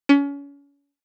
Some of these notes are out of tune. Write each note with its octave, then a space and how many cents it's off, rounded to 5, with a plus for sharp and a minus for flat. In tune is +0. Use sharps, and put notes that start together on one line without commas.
C#4 +30